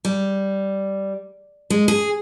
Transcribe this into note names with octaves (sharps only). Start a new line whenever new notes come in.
G3
G#3
G#4